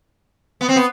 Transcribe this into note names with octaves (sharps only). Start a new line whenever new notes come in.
B3
C4
B3